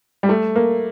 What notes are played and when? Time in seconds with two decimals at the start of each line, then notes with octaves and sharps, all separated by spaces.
0.23 G3
0.29 A3
0.56 A#3